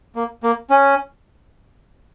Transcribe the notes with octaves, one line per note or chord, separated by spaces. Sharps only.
A#3
A#3
C#4